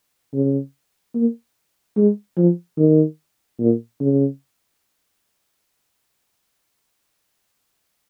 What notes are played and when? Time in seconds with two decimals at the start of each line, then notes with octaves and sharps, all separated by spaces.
0.33 C#3
1.15 A#3
1.97 G#3
2.37 F3
2.78 D#3
3.60 A#2
4.00 C#3